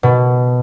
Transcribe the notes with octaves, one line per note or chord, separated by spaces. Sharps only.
B2